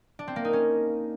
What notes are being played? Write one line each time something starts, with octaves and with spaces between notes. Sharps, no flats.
D4
C4
A#3
D#4
C#4